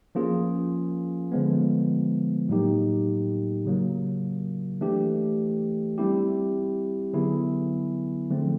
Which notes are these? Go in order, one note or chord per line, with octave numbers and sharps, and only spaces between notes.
F3 A#3 C#4 F4 G#4
D3 F3 G#3 B3
A2 F#3 A#3 D#4 G4
C#3 F#3 A#3
E3 A3 D4 G4
G3 C4 E4 G4
D3 F#3 B3 E4 G#4
D3 F3 A3 C4